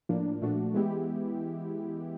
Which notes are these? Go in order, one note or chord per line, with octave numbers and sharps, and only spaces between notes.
A2 F3 A#3 D4
A#2 F3 A3 D4 F#4
E3 G#3 B3 E4 G4